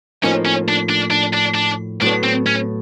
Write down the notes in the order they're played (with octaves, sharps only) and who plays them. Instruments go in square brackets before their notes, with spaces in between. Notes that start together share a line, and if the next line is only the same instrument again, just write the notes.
[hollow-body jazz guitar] A2 F3 A#3 D#4 [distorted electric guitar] C#4
[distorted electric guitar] C#4
D4
D4
D4
D4
D4
[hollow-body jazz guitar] A2 F#3 B3 [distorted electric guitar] D4
[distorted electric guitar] C4
C#4